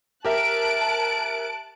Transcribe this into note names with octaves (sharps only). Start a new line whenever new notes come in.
G4 A#4 E5 A5 F#6 D7